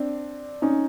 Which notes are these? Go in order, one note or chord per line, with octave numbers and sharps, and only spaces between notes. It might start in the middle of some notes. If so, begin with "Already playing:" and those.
Already playing: C4 D4
C#4 D#4